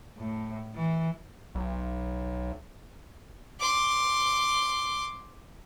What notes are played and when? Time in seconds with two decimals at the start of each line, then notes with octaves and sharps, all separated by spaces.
0.17 A2
0.75 E3
1.55 B1
3.59 C6 D6